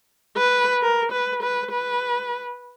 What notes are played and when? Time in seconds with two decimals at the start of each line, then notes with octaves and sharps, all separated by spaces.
0.37 B4
0.82 A#4
1.12 B4
1.43 B4
1.72 B4